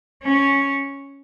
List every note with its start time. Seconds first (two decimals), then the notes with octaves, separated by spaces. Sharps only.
0.23 C#4